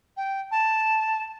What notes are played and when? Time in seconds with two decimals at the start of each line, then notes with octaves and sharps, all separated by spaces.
0.17 G5
0.51 A5